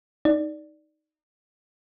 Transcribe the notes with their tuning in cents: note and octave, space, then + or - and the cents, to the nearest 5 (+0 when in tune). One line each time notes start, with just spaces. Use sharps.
D#4 +0 D5 +0